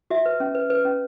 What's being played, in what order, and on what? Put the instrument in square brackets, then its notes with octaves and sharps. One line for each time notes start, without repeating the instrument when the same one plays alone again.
[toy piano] F#4 E5
B4
C#4
B4
B4
C#4